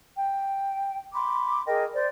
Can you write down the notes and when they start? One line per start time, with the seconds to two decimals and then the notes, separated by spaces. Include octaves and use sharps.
0.16 G5
1.14 B5 C6 D6
1.66 G#4 A#4 D#5 G5
1.94 C5 D5